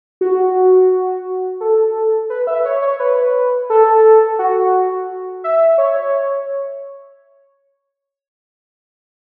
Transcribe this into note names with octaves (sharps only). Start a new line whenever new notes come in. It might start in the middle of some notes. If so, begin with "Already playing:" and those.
F#4
A4
B4
E5
C#5
C#5
B4
A4
F#4
E5
C#5